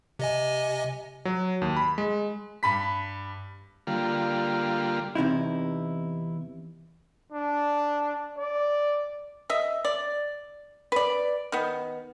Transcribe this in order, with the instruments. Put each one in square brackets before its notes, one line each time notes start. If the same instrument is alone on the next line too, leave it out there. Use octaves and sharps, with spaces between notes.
[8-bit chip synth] C3 D#5 G#5
[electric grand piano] F#3
D#2
B5
G#3
[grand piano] G2 B5 B6
[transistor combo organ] D3 G3 A#3 F4
[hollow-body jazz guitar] E2 C3 D#4 E4
[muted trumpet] D4
D5
[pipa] D#5 E5
D5
B4 D5
D#3 B3